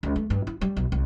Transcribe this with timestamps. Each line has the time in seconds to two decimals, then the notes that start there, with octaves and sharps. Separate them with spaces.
0.03 C#2
0.16 A3
0.30 G2
0.47 E4
0.61 G3
0.76 B1
0.92 C2